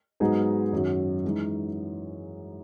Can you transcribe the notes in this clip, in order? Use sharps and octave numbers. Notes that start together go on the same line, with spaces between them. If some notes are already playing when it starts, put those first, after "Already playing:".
G#2 F#3 B3 D#4 G#4
F#2 D#3 F#3 C#4
E3 G#3 D#4